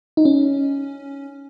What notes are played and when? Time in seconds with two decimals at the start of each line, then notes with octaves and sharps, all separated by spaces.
0.17 D#4
0.25 C#4